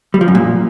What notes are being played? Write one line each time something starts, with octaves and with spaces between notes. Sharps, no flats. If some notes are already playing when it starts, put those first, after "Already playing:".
G3
F3
F#2
A#2